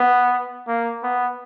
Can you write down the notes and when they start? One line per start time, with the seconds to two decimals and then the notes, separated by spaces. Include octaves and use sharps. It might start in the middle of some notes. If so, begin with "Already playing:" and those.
Already playing: B3
0.68 A#3
1.03 B3